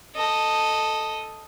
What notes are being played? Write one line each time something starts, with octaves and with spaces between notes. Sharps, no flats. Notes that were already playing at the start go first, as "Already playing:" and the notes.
A4 D#5